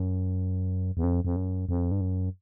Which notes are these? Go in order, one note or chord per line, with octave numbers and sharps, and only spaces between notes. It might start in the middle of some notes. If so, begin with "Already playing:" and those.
Already playing: F#2
E2
F2
F2
F#2
F2
G2
F#2